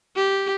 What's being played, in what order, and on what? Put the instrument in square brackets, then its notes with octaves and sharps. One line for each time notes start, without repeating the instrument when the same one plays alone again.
[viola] G4